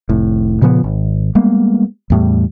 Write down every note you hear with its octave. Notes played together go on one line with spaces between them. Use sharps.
F1 A2
A#2 C#3 F3 B3
G#1
G3 G#3 A#3 B3
E2 A2 G3